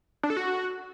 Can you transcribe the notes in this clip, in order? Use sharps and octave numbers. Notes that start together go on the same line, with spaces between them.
D4
A4
F#4